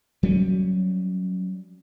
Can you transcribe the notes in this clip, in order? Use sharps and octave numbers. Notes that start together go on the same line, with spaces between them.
F#3 G3 C#4